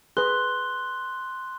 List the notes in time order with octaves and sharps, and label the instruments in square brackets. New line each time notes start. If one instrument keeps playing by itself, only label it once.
[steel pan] G#4 B4 [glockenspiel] C6 F#6 G7